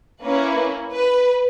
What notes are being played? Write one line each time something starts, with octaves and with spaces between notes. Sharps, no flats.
A#3 C#4 E4 B4
B4